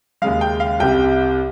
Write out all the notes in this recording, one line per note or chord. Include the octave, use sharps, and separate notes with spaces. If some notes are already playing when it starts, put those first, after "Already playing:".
D#2 C#3 G#3 F5
G5
F5
C2 C3 G3 G5